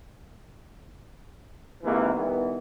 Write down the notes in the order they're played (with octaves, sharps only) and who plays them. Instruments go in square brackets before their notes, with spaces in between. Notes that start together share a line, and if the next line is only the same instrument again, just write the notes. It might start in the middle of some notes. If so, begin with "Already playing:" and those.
[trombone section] G#2 C3 D#3 E3 A#3
D#3 E3 G3 B3